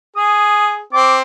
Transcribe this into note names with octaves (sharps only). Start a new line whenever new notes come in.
G#4 D#6
C4 D6